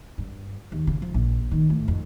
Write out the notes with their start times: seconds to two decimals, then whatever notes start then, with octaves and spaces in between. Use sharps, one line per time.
0.18 G2
0.72 D#2
0.87 C#3
1.02 F3
1.14 A#1
1.51 D#3
1.70 A2
1.88 F2